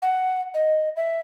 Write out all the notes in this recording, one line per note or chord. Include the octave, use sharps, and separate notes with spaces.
F#5
D#5
E5